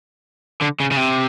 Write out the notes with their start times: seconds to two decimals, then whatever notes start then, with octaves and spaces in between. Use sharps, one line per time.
0.61 D3
0.80 C#3
0.91 C#3
0.97 C3